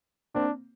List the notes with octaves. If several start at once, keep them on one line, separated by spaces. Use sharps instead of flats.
A#3 C4 D4